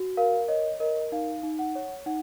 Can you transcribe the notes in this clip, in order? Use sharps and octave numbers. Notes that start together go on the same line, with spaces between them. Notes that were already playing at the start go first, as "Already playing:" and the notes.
Already playing: F#4
A#4 F5
C#5 D#5
A#4 D#5
D#4 F5
D#4
F#5
C#5
D#4 F#5